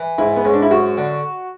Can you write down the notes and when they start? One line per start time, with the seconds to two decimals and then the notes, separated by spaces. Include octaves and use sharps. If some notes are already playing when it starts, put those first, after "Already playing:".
Already playing: E3
0.18 G#2 E4
0.36 B3
0.45 G#2 C#4
0.53 D4
0.62 E4
0.71 F#2 F#4
0.98 D3